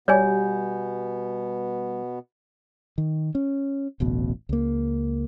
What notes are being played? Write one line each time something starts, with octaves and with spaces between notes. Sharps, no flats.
B2 G3 B3 C#5 D5 G#5 G6
D#3
C#4
D1 A1 B2
C#2 A#3